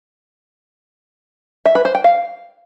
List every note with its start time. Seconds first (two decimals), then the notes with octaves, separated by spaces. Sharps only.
1.66 E5
1.75 B4
1.85 C5
1.95 G5
2.04 F5